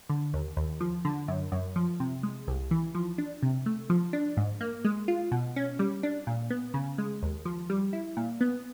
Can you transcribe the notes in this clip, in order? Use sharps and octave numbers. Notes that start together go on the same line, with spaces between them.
D3
D#2
D#2
F3
D3
F#2
F#2
F3
C3
G#3
C2
E3
F3
D4
C3
A3
F3
D4
G#2
A#3
G#3
F4
B2
C#4
G3
D4
A#2
B3
C#3
G#3
D#2
F3
G3
E4
A#2
B3